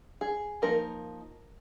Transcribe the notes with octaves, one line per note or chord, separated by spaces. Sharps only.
G#4
F3 A#3 D#4 A#4